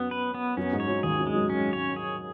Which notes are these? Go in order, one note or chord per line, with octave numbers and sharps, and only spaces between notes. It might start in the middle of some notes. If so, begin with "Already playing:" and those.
Already playing: F#2 F#3 B3
B4
B3
F#2 F#3 C#4
G#2 G#3
C#5
F#2 F#3
D#2 D#3 G#4
F#2 F#3
G#3
F#2 F#3
C#4
C#5
G#4